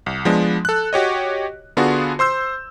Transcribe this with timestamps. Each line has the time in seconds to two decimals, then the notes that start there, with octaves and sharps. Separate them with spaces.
0.06 C2
0.25 F3 G#3 B3 D4
0.65 A4 F#6
0.93 F#4 G4 C#5 D#5
1.77 D3 B3 D4 F4 F#4 G#4
2.19 C5 C6 E6 G6